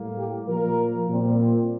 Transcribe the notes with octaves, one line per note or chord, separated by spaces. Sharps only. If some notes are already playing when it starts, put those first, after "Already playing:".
Already playing: A2 G3 A#3
G4
A#2 F3 A#3 A#4
A#2 G3 C4